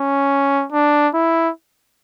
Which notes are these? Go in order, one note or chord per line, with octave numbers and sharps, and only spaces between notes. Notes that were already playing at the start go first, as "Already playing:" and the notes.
Already playing: C#4
D4
E4